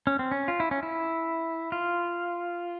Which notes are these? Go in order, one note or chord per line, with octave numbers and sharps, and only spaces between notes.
C#4
C4
C#4
F4
E4
C#4
E4
F4